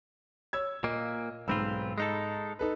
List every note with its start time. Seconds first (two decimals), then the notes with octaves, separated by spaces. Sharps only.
0.53 C#5 E6 G#6
0.84 A#2 A#3 D#5
1.48 B1 G#2 C4 F4 B5 E6
1.98 G#3 D#4 A4
2.59 D#4 A4 B4